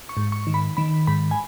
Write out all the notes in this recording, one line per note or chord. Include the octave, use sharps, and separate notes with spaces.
C#6
G#2
C#6
D#3
B5
D#3 B5
G#2 B5
G#5